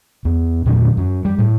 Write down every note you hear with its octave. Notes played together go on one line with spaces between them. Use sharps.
E2
E2 A#2 D3 F#3
F#2
G3
A2